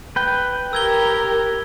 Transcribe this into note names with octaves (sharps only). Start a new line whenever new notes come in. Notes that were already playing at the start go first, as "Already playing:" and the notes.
B4 G5
G4 A#4 E6 G#6 G7